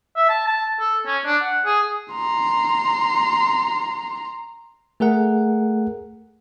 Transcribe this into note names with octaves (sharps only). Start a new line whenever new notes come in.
E5
A5
A5
A4
C#4
D4
F#5
G#4
A#5 C6
A3 G#4 A#4 F#5